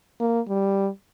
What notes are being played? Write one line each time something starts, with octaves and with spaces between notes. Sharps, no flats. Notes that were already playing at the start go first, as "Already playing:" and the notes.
A#3
G3